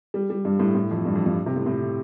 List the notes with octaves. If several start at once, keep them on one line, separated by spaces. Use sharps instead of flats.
G3
G3
G2
A2
A2
F2
G2
F2
G2
C3
A2
A2